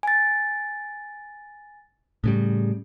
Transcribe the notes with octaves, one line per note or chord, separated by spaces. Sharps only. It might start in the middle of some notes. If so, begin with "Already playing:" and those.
G#5 A6
A2 C#3 G3